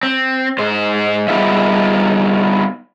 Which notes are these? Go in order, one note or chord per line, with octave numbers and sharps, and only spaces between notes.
C4
G#2 C5
G3 B3 D#4 F4 G#4 E5